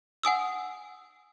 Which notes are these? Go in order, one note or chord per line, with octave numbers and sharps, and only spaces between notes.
F#5 G#5 D#6 E6